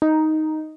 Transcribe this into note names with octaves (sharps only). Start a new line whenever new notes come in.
D#4